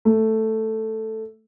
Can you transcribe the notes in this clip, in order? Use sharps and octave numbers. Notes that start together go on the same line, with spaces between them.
A3